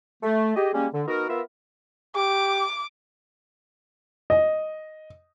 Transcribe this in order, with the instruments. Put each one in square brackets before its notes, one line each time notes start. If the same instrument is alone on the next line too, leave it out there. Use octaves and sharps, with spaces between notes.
[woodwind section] A3
G4 G#4 D#5
G3 G#3 A#3 C#4
D3
B3 D#4 F#4 A#4
B3 F4 A#4 E5
[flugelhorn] G4 [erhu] D6
[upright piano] D#5